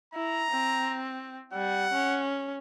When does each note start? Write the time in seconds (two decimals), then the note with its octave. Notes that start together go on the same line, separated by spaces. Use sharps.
0.14 E4 A#5
0.51 C4
1.53 G3 F#5
1.93 C#4